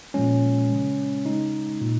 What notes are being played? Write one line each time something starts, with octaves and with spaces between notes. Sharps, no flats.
A#2 F3 G#3 C#4
C#3 G#3
C#3 G#3 D#4
A#2